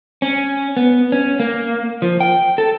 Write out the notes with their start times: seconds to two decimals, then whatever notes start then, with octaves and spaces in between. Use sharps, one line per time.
0.22 C#4
0.77 B3
1.12 C#4
1.40 A#3
2.02 F3
2.20 G5
2.58 A4